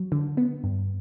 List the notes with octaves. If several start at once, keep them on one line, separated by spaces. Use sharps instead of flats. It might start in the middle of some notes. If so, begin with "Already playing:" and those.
Already playing: F#3
D3
B3
G2